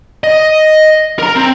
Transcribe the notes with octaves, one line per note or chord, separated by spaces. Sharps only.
D#5
A#4 A#5
C4